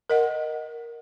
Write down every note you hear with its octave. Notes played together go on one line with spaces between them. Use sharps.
A#4 D#5 F#5